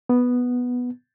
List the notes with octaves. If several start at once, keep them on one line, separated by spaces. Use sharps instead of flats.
B3